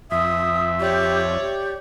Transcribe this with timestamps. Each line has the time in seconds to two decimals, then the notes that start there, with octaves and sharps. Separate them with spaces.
0.11 F2 E5 D#6
0.80 G4 C#5 D5
1.40 G4